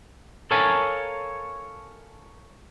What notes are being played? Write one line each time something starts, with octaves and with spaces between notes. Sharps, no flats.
A4 A#4 C#5 F5 G#5 A5